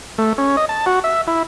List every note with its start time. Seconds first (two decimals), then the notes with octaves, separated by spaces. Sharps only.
0.18 A3
0.38 C#4
0.57 D#5
0.69 A5
0.86 F#4
1.04 E5
1.27 E4